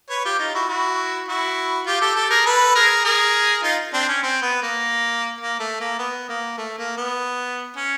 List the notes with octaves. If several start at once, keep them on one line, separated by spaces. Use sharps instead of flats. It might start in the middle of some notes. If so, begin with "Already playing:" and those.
B4 C#5
F4 G4
D#4 F4
E4 F#4
E4 F#4
E4 F#4
F4 G4
G4 A4
G4 A4
G#4 A#4
A4 B4
G#4 A#4
G#4 A#4
D#4 F4
C4 D4
C#4
C4
B3
A#3
A#3
A3
A#3
B3
A#3
A3
A#3
B3
C#4